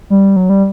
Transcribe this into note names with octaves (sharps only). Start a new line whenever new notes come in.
G3
F#3
G3